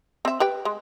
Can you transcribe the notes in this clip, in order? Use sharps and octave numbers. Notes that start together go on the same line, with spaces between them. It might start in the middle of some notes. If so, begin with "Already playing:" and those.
C4 E5
G4 B4 G5
G#3